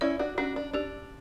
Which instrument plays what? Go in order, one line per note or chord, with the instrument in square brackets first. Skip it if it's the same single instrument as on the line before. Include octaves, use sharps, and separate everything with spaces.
[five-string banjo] C#4 E4 [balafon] D5
[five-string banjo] D4 F#4
[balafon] C#4 [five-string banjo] D4 F#4
[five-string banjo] D4
[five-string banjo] D4 [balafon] G4